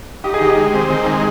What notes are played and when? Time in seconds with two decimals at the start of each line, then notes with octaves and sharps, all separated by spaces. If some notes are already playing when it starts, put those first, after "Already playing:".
0.24 D#4 G4
0.34 G#4
0.41 D#3 G4
0.57 G#3
0.73 C4
0.90 D#3
1.07 G#3